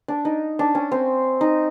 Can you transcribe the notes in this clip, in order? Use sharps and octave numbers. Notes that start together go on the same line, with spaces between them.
D4
D#4
D4
C#4
C4
D#4